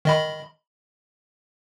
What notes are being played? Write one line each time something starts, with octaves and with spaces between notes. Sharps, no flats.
D#3 D#5 B5